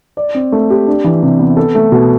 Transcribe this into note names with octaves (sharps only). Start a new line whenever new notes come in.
D5
C4
A3
G4
D4
E3
C3
B3
A4
A3
B2